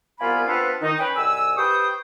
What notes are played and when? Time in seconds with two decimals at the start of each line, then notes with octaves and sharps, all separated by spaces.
0.20 C2 A#3 B3 F4 G#5 B5
0.47 B3 C4 D4 F4 A4 B4
0.82 D#3 D#4
0.99 C#4 B4 G5
1.16 C2 G#2 G#5 E6
1.57 G4 B4 C5 G5 C#6 D#6